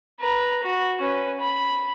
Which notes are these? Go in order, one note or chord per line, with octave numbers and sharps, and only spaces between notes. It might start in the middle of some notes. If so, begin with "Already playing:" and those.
B4 A#5
F#4
C#4 B4
B5